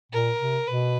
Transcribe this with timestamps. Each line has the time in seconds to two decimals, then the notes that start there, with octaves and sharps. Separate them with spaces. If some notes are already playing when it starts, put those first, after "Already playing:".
0.12 A#2 A#4
0.39 C3
0.67 B2 B4